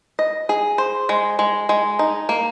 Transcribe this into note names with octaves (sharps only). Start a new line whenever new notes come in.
D#5
G#4
C5
G#3
G#3
G#3
D#4
A#3